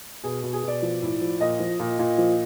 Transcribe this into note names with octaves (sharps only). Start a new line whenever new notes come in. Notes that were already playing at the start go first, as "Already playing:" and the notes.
B2 G#4
B2
G#4
B2 D5
F3
A2
F3
A#2 D#5
F3
A#2
A#2
F3